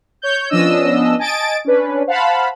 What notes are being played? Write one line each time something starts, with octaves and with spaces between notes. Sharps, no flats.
C#5 G6
F3 B3 C#4 D4 D#5 E6
D#5 G#5 A5 A6 D7
C#4 D4 B4
C5 F5 F#5 A5 B5